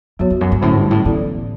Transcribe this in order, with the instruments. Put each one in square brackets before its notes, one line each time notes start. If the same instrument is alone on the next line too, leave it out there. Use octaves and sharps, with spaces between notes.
[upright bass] F#2 [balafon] F#3 B3 F#4 C#5
[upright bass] E2
F#2
G2
[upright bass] A2 [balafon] D3 F#3 C#4
[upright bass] G2
A2
[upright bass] A2 [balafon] E3 B3 E4 A4 D5